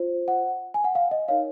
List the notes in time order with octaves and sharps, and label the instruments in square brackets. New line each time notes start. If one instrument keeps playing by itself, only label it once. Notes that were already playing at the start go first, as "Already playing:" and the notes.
Already playing: [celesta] F4 C5
F#5
G#5
F#5
F5
D#5
D#4 A#4 C#5 F5